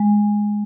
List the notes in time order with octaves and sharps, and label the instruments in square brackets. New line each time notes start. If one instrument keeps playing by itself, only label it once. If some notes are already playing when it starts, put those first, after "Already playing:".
Already playing: [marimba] G#3